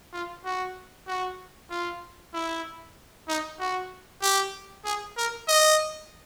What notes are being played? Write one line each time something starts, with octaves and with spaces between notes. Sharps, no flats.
F4
F#4
F#4
F4
E4
D#4
F#4
G4
G#4
A#4
D#5